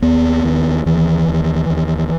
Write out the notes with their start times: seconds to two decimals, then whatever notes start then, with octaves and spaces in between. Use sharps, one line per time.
0.02 D#2 B3
0.45 D#2
0.86 D#2 E3
1.28 D#2
1.70 D#2